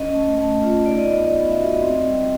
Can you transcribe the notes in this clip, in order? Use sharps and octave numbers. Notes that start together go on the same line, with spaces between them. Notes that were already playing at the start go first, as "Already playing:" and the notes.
Already playing: C#4 D#5
A3
A3
F4
D#4 D5
D#5
B3 D5
B3
E5
F#4
D#5
C4
G3